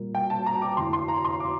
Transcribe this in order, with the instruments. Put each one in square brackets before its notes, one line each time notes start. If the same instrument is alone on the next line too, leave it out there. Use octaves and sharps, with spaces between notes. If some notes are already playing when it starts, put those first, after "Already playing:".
Already playing: [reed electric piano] A#2 G3 A#3 F4 A#4
[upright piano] G5
A5
A#5
D6
[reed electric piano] F2 D3 A3 E4 [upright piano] C6
[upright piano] C6
A#5
C6
D6